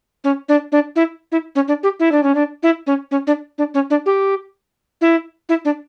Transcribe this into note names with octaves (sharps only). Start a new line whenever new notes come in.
C#4
D4
D4
E4
E4
C#4
D4
G4
E4
D4
C#4
D4
E4
C#4
C#4
D4
D4
C#4
D4
G4
E4
E4
D4